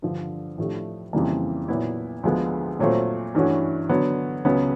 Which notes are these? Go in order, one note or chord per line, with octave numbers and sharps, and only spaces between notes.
G2 D3 F3
A2 F3 A3 D4 G4
F2 C#3 E3 G3 A#3
A#2 F#3 B3 E4
D2 D3 F3 G#3 B3
A#2 F#3 A3 C4 F4
G2 E3 A3 C#4 F#4
D3 F#3 B3
C#2 C#3 F#3 B3